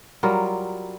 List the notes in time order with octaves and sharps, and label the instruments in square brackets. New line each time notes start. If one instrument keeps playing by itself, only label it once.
[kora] F#3 G3 F4 A#4